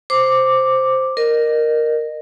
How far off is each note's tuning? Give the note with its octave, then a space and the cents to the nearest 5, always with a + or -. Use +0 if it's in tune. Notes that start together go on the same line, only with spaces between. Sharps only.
C5 +0 D6 +0
A#4 +0 D#5 -30